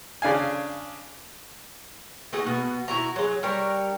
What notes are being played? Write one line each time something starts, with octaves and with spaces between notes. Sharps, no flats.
C#3 D4 F5 G#5
A3 D#4 F#4 G#4
B2 B3 F#5
B2 E4 F#4 A#5
F#3 G#3
G3 D4 A#4 C#5